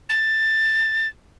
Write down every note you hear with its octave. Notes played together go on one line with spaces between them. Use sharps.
A6